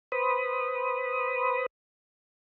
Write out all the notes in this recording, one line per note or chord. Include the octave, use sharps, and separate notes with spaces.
B4 C5 B5 D#6